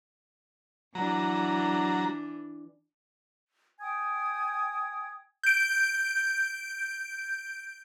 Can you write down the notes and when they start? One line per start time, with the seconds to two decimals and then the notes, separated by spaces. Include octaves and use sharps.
0.95 E3 F#3 D4 A#5
3.79 G5 G#5 D#6 G#6
5.43 G6 D7